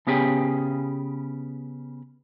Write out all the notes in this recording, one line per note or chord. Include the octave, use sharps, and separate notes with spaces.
C#3 B3 C#4 G4 G#4